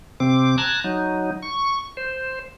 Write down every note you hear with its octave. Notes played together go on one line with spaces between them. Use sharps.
C3 C4 D6
A5 A#5 F#6 G#6
F#3 D#4
C#6
C5